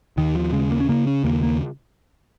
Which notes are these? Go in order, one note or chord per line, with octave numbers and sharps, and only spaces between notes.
D#2 D#3
F3
C#3 G#3
A#3
C#4
C#3 A#3
C#4
D#2 A#3
A#3